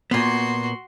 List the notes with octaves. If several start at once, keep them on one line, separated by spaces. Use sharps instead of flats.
A#2 B3 F#4 C6